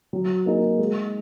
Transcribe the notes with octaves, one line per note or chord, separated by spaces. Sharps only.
F#3
A#3 D#4 G#4
G#3